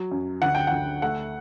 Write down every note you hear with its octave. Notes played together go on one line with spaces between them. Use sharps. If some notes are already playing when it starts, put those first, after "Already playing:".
Already playing: F#3
F#2
D2 F#5
G5
D2 F#5
A3 F#5